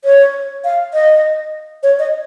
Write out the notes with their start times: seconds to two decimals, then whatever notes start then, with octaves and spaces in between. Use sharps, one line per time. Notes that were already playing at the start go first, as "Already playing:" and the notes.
0.05 C#5
0.64 F5
0.94 D#5
1.83 C#5
1.99 D#5